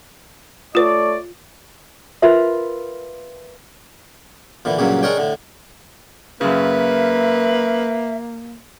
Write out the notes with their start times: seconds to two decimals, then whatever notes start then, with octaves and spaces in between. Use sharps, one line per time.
0.75 A3 F4 B4 C#5 D5
2.22 F4 A#4 B4 E5
4.65 A#2 D3 E3
4.79 C#2 G2 A#2 C#3 F#3 A#3
5.03 G#3 D4 A#4 C#5 D5 G5
5.17 A2 D3
6.41 F#2 C#3 A#3 B4 E5